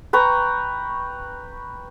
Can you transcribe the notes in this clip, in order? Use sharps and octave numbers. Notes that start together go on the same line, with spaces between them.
B4 G5 A#5 C#6